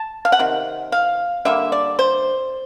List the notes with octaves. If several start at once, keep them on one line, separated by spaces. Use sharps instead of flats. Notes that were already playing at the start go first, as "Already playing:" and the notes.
Already playing: A5
F5
F#5
C3 D#3
F5
D3 G3 A#3 E5
D5
C5